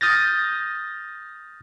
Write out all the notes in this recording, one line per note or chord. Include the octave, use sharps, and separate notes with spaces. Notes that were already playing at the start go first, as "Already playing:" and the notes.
D#6 F6 G6 A6 A#6